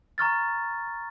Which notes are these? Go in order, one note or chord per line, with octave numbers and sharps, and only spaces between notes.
A#5 C#6 F6 A6